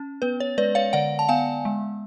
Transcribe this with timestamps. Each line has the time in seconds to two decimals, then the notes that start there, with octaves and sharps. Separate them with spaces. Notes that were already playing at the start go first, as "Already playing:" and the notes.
Already playing: C#4
0.22 B3 B4
0.40 C#5
0.58 G#3 B4 D5
0.75 C#5 F5
0.93 D3 D5 F#5
1.19 A5
1.29 B3 F5 G#5
1.65 G#3